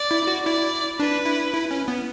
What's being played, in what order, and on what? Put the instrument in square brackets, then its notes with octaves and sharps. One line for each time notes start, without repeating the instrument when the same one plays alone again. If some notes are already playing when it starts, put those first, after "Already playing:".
Already playing: [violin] D5
[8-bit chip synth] E4
F#4
[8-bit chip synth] E4 [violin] D5
[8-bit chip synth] D4 [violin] B4
[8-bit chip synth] E4
E4
C#4
B3